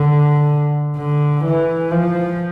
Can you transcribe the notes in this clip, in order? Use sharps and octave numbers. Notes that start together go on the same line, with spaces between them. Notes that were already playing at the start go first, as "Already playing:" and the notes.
Already playing: D3
D3
E3
F3